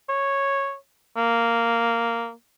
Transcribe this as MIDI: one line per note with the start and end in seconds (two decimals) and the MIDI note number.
0.09 0.75 73
1.17 2.32 58